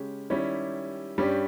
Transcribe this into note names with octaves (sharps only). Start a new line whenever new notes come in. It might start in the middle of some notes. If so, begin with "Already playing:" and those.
Already playing: C#3 G#3 C#4 G4
D#3 G3 C#4 E4 G4
G2 G3 C#4 G4